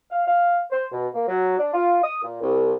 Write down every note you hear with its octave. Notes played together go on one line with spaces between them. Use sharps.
F5
F5
C5
B2
A#3
F#3
D4
F4
D#6
A#2
C2